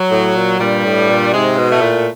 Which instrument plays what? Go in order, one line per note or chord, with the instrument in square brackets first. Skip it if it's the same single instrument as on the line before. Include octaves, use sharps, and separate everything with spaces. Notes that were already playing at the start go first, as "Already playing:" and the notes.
Already playing: [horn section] F#3
[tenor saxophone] A2
A#2
[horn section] G2 G3 [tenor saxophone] A#2
[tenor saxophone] A2
A#2
[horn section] G#2 G#3 [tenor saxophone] C3
[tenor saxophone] B2
[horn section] A2 A3
[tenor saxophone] A#2